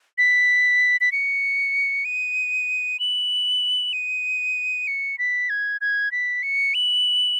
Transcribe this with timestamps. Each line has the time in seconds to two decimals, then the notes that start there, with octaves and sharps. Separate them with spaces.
0.18 B6
1.01 B6
1.12 C#7
2.05 D#7
3.00 F#7
3.93 D#7
4.87 C#7
5.19 B6
5.50 G#6
5.81 G#6
6.12 B6
6.43 C#7
6.74 F#7